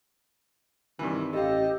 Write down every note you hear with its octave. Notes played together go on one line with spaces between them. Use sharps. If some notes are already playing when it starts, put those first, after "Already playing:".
G2 C3 D#3 E3
A1 G4 A4 D#5 F5